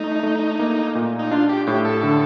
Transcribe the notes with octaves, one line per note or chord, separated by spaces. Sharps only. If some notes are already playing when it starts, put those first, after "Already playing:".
Already playing: A3 D#4
A3
A#3
A#2
D#4
D4 F4
G4
A2 G4
A4
D3